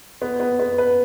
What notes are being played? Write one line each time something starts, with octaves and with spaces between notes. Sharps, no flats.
B3
B3
B3
B4